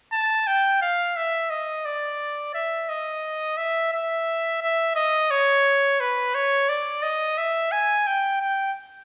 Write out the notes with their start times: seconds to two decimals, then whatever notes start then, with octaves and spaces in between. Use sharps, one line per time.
0.12 A5
0.47 G5
0.82 F5
1.17 E5
1.50 D#5
1.85 D5
2.55 E5
2.89 D#5
3.57 E5
3.92 E5
4.62 E5
4.96 D#5
5.31 C#5
6.00 B4
6.35 C#5
6.69 D5
7.03 D#5
7.38 E5
7.72 G#5
8.07 G5
8.41 G5